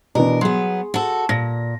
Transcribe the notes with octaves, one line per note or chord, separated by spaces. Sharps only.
B2 E3 D4 A#4
F#3 B3 G#4 C6
F#4 A4
A#2 A#6